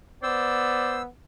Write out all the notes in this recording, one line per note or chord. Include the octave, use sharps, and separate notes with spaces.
B3 C5 D5 E6